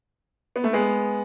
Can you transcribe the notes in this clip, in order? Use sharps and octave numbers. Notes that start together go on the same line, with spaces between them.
B3
A3
G#3 B3